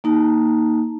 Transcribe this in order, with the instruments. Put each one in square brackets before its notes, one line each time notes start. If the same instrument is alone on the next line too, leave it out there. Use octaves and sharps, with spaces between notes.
[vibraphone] A#3 D#4 A5